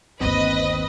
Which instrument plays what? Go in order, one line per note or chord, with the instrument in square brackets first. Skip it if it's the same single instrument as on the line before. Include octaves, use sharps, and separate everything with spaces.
[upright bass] G1 D#2 [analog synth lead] C4 [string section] B4 D#5